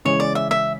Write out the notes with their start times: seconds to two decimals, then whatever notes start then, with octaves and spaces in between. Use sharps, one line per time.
0.05 C#3 E3 G#3 C#4 C#5
0.20 D5
0.35 E5
0.51 E5